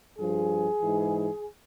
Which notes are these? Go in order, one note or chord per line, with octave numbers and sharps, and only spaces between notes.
G2 F3 G#4
G#2 E3